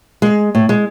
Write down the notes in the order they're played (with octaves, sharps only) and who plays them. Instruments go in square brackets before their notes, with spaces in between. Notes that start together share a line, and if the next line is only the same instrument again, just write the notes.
[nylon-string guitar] G#3
A2
G#3